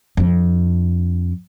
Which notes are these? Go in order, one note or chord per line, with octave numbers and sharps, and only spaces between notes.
F2 D4